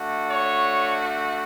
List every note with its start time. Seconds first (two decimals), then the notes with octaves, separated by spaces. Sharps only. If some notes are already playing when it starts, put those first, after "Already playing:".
Already playing: A3 D4 F#4
0.29 C#5